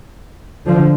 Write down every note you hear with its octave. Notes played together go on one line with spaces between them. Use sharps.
D3 F3